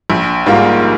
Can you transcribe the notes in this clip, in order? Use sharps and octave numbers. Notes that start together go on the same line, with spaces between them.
A#1
G#2 G3 A#3 F4